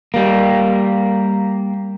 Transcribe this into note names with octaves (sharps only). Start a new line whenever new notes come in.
G3 A#3